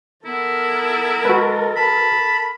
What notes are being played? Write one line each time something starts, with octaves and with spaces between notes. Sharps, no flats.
B3 E4 A4 A#4
G#3 F#4 B4
A5 B5